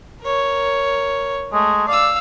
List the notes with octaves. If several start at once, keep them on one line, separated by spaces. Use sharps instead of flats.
A#4 C#5
G#3 A3
D5 F5 E6